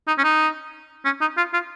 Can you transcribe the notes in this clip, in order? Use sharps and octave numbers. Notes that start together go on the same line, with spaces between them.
D#4
C#4
D#4
C#4
D#4
F4
F4